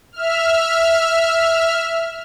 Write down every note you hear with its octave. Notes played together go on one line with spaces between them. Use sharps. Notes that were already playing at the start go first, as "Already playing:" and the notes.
E5 F6